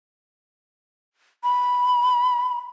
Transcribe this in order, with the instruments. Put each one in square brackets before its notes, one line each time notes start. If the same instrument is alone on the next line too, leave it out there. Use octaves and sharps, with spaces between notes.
[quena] B5